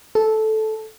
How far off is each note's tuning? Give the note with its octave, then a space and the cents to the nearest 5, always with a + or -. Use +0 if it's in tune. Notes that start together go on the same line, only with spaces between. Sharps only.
A4 -10